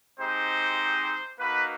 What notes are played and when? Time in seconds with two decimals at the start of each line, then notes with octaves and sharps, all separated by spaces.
0.19 G#3 C4 D#4 G4 C5
1.39 A#3 D#4 F#4 B4